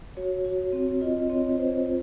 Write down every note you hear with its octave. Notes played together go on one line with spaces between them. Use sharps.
F#4 C#5
F#4
C4
F4 D#5
C4 C#5
C4 C5
F4